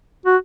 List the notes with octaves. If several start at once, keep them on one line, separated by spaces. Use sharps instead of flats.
F#4